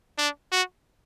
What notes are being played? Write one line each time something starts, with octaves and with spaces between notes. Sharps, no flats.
D4
F#4